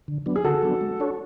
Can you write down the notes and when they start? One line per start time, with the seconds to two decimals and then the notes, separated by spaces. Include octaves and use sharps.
0.08 D3
0.26 F#3 B3 D4
0.36 G#4
0.45 D3 F#4 A4
0.63 F#3 B3 D4
0.81 G#3
1.00 D4 F#4 A4 C#5